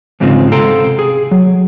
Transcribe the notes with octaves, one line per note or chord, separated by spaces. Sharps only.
E2 G#2 C#3 G#3 C4 F4
C3 A4 F5 G5 A#5 C6
G#4
F#3